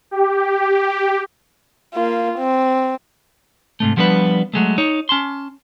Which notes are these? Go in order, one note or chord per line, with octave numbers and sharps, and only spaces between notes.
G4
A#3 F4
C4
G#2 C3 A3
F3 G3 B3 D4 B4
F#3 G#3 A3
D#4 C#5
C#4 A5 C6